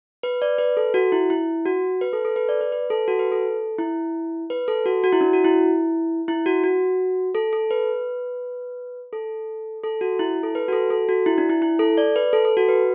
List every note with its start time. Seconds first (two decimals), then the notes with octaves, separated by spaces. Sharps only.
0.23 B4
0.42 D5
0.58 B4
0.77 A4
0.94 F#4
1.12 E4
1.30 E4
1.66 F#4
2.01 B4
2.13 A4
2.25 A4
2.36 B4
2.49 D5
2.61 B4
2.72 B4
2.90 A4
3.08 F#4
3.19 B4
3.32 A4
3.79 E4
4.50 B4
4.68 A4
4.86 F#4
5.04 F#4
5.12 E4
5.21 D4
5.33 F#4
5.45 E4
6.28 E4
6.46 F#4
6.64 F#4
7.35 A4
7.53 A4
7.71 B4
9.13 A4
9.83 A4
10.01 F#4
10.19 E4
10.43 A4
10.55 B4
10.68 F#4
10.73 A4
10.90 A4
11.09 F#4
11.26 E4
11.38 D4
11.50 E4
11.62 E4
11.79 A4
11.98 D5
12.16 B4
12.33 A4
12.45 A4
12.57 F#4
12.69 B4